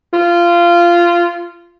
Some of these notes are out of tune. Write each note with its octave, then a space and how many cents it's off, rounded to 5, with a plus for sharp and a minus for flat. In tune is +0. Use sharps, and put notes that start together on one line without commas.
F4 -15